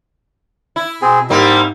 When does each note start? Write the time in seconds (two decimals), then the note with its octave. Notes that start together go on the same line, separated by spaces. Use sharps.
0.76 E4
1.02 B2 C4 G#4
1.30 G#2 G3 A#3 C4 E4